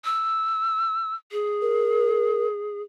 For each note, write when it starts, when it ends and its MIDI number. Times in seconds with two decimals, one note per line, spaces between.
0.05 1.15 88
1.32 2.82 68
1.62 2.47 70